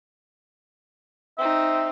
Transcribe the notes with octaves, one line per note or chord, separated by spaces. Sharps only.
C4 D#4 E5